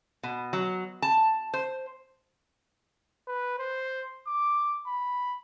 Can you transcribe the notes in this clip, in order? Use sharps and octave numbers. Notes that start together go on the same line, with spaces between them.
B2
F#3
A5
C5
B4
C5
D6
B5